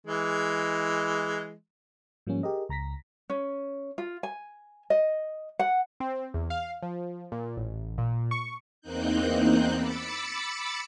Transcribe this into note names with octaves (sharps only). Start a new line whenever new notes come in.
E3 G#3
G#2 F3 G3 A#3 C#4
G4 G#4 A#4 D#5
C#2 A#5 A#6 B6
C#4
F4
G#5
D#5
F#5
C4
E2
F5
F3
A#2
A1
A#2
C#6
E2 A#3 C4 D#4 F#6 G6
B5 D6 E6 A6 C#7